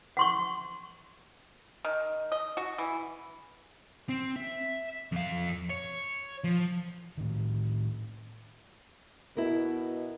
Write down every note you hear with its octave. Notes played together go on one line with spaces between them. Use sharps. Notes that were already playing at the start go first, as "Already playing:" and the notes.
F#5 C6 C#6
D#3
D#5
F#4
E3
C4
E5
F2 F5
C#5
F3
A2 D#3
B2 E4 A#4